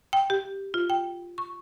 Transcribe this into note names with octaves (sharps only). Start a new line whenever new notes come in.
G5
G4
F4
G5
C#6